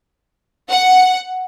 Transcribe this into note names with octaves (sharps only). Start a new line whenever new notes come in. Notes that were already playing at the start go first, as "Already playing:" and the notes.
F#5